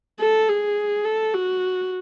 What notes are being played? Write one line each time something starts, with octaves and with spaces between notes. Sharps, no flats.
A4
G#4
A4
F#4